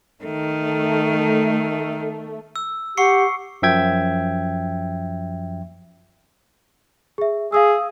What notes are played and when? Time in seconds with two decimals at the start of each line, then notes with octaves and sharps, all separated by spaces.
0.24 D#3 A3
2.56 E6
2.97 G4 F#5 C#6 C7 C#7
3.62 F#2 F3 E5 G5 G#6
7.18 G#4 E5
7.52 G#4 F5 D#6 E6